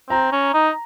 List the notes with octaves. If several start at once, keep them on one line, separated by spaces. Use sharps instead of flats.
C4 A#5
C#4
D#4